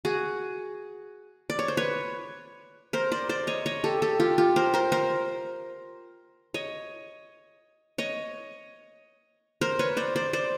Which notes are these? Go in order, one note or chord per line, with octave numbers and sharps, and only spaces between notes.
F#4 G#4
D5
C#5
C5
B4 C#5
A#4 C5
C5 D5
C5 D5
C#5 D#5
C#5 D#5
G4 A4
G4 A4
F4 G4
F4 G4
A#4 C5
A#4 C5
A#4 C5
C#5 D#5
C#5 D#5
A#4 C5
B4 C#5
C5 D5
C5 D5
C5 D5